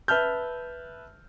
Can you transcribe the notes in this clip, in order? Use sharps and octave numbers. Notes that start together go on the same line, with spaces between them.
B4 E5 A5 F6 G6